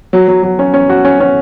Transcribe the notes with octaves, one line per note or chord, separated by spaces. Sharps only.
F#3
F#3
F#3
C#4
C#4
F#4
C#4
C#4